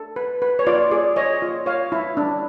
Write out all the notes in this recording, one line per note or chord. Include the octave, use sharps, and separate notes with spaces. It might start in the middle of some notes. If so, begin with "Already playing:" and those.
Already playing: A4
B4
B4
C#5
F4 D5
G#4 D5
C#5 D#5
F4
C#5 F5
E4
D4